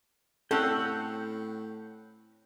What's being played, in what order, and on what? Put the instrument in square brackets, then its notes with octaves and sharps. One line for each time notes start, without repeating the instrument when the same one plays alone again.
[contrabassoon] A2 [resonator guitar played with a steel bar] C4 C#4 [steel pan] A4 [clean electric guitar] F#5 G5